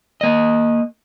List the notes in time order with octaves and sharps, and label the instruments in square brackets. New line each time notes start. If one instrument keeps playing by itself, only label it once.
[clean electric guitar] A#3 D#5